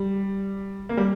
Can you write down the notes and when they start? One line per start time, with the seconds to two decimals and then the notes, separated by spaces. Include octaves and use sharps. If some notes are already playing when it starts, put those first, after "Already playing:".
Already playing: G3
0.89 A#3
0.97 G3